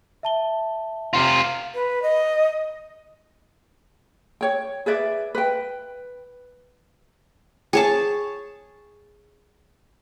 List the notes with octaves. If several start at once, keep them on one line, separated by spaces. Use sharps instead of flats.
E5 A5 G7
C3 F4
B4
D#5
C#5 G5
G#4 B4 D5 E5
B4 G5
G#4 C#5 A5